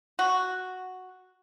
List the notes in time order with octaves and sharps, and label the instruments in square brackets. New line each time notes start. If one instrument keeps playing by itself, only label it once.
[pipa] F#4